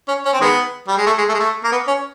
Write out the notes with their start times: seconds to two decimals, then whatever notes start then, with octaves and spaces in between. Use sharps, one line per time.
0.08 C#4
0.25 C#4
0.33 C4
0.41 D#3 G#3 B3
0.88 G3
0.97 G#3
1.06 A3
1.18 G#3
1.29 A3
1.34 G#3
1.39 A3
1.64 A#3
1.72 B3
1.87 C#4